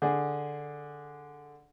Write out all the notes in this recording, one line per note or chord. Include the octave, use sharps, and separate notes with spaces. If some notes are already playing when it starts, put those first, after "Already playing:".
D3 G#4